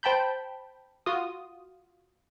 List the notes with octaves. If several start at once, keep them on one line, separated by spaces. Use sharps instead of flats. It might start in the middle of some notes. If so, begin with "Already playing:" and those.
C5 G5 A5 B5 G6
F4 F#4 D#6